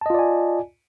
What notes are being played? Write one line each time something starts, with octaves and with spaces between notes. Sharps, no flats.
F4 D5 D#5 G#5 A5